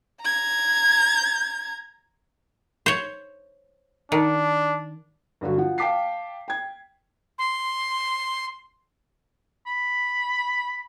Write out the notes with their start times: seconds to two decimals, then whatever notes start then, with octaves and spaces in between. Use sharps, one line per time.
0.21 A#5 G#6
2.86 C5 C#5
4.12 D#3 D4
5.41 G2 D3 F#3 F#4
5.58 F3 F#5
5.78 F5 G5 A5 D6 B6 C7
6.48 G5 G#6
7.39 C6
9.67 B5